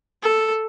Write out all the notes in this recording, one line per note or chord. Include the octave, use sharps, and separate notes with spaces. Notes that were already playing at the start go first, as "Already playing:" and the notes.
A4